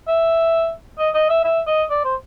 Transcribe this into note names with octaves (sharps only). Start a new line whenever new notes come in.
E5
D#5
D#5
E5
E5
D#5
D5
C5